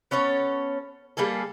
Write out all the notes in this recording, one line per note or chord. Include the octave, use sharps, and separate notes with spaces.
B3 C#4 A4 C#5
G3 A#3 G#4 A4